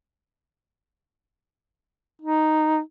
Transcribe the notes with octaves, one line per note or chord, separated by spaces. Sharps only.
D#4